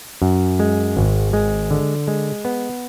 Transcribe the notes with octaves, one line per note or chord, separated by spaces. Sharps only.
F#2
G#3
G#1
G#3
D3
G#3
B3